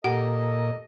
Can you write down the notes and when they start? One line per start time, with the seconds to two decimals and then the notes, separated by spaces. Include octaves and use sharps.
0.04 A#2 G4 A4 D#5 F#5